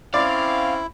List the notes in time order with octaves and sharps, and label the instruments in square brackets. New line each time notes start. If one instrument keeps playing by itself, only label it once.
[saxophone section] C4 C#4 [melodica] E4 [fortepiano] D5 [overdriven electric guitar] F5